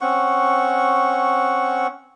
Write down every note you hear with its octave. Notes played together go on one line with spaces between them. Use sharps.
C4 C#4 F#5 C#6